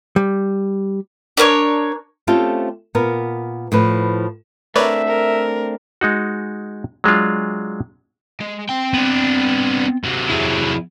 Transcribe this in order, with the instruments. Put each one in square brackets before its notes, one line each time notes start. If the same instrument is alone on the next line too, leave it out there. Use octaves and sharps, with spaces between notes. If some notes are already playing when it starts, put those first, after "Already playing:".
[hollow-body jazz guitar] G3
[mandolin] D4 A#4 B4 C#5
[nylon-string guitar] A3 C4 C#4 F4 G4 A4
A#2 B3 A#4
A2 F3 B4
[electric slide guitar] A3 C4 D4 [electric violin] A#4 [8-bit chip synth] B4 C#5 D5 [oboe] E5
[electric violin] A#4
[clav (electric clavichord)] G#3 D#4 F#4
F#3 G#3 D4 F4
[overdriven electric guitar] G#3
C4 G5
[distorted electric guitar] B3 D4
C3 F#3
[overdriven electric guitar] E4 G#4